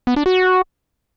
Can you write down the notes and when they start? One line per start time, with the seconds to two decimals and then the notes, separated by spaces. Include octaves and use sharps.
0.07 B3
0.16 D4
0.26 F#4